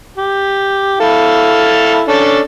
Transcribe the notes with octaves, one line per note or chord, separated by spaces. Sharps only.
G4
E4 A4 F5
C#4 D4 A4